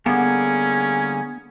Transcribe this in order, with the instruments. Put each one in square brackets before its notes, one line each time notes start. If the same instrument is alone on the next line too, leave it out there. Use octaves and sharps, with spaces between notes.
[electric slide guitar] D3 G3 A#3 [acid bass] B3 [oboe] C#4 [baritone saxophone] G#4